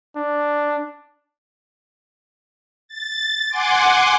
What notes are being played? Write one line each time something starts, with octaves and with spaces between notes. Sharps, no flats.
D4
A6
F#5 G#5 C6 D6